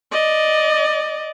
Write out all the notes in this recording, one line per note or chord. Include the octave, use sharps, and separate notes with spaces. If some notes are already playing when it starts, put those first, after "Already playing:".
D5 D#5